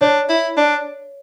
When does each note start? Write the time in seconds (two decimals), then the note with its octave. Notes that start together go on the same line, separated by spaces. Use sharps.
0.01 D4 C#5
0.29 E4
0.57 D4